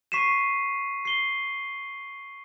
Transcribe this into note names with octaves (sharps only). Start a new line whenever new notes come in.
C#6 B6 C7 D#7 E7
C7 G7